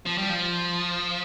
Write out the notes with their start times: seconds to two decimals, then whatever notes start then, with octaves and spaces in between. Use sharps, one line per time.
0.06 F3
0.18 G3
0.30 F3